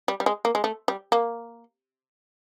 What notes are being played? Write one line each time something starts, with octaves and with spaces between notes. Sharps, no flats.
G3
G3
G#3
A#3
G#3
A3
G3
A#3